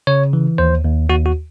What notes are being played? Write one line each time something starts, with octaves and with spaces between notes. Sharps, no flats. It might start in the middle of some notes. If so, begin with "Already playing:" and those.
C#3 C#5
E3
D#2 C5
D#2
D#2 F#4
F#4